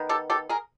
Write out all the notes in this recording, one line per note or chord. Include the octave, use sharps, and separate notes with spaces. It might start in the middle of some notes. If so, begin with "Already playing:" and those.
Already playing: D#3 B3
G4 A4
G4 A4
G#4 A#4